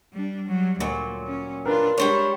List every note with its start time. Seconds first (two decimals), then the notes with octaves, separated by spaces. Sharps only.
0.13 G3 D4
0.47 F#3 G3
0.80 D2 A#2 F#3
1.27 C#4
1.66 D4 F4 A#4 B4
1.98 G3 G#3 D4 C5 C#5